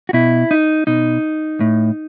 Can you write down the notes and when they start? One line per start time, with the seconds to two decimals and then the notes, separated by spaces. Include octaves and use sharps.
0.09 F#4
0.13 B2 E4
0.51 D#4
0.87 B2 D#4
1.61 A2